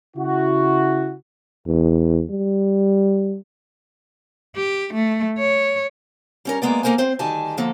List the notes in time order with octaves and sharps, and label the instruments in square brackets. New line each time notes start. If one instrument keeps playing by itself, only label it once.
[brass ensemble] C#3 E4 F#4
[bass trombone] E2
G3
[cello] G4
A3
C#5
[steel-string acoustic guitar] G3 C#4 A#4
G#3 A#3 B3 D5
A#3 A4 A#4 C5 G#5
C4 C5
D2 D#3 G3 A4 G#5 A5
D3 F3 A#3 A4